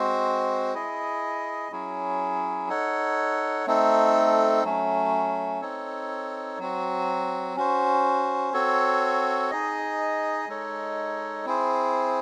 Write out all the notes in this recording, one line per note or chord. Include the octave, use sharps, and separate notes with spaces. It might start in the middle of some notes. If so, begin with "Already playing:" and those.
Already playing: G#3 C4 F#4 C5
E4 G#4 D#5
F#3 C#4 E4 G#4
D#4 A4 C#5 F#5
A3 C4 D#4 A4
F#3 A3 C#4
C4 D#4 A4 C#5
F#3 C4 F#4
C#4 F#4 C5
C4 F#4 A4 C#5
D#4 G#4 D#5
G#3 D#4 A4 C#5
C4 E4 G#4 C5